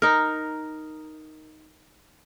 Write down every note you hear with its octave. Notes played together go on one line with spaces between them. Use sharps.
D#4 A#4